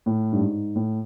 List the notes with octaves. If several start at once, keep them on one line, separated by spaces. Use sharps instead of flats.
A2
G2
G#2
A2